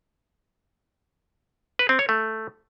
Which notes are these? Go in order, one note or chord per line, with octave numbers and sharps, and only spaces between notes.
B4
C4
C#5
A3